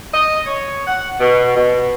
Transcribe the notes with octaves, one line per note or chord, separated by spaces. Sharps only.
D#5
C#5
F#5
B2
B2